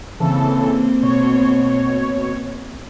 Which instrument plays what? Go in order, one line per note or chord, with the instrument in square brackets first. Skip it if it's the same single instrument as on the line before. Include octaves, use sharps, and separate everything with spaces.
[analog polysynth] C#3 E3 A4 [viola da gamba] A#3 C4
[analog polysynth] B2 C#5